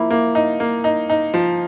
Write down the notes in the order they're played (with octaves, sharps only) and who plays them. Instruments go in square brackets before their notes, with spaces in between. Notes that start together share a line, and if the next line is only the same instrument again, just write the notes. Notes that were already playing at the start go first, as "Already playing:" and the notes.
Already playing: [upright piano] F3 A#3 [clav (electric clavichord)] E4
[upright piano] A#3
D#4
A#3
D#4
D#4
F3